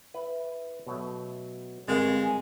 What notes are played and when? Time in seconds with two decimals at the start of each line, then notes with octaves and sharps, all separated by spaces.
0.14 E4 B4
0.87 B2 F#3 A3
1.88 G1 G#3 C4 A#4 F5
2.23 G#5